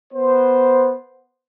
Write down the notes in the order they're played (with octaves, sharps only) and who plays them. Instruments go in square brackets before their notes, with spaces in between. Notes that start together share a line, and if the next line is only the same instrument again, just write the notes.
[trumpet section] B3 C5